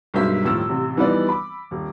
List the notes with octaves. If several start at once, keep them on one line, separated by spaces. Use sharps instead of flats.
B1 G2 G#3 A#3 C5 E5
D#1 A2 F3 E6
A1 C3
E3 F3 G3 B3 D#4 D5
B5 D6
D#1